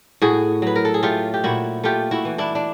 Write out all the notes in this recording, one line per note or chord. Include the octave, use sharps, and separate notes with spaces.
A2 F#4 G#4
F#3 B4
A#4
A4
G#4
A3 F4 G4
G4
A#2 E4 F#4
A3 F4 G4
E4 F#4
E3
D4 E4
D4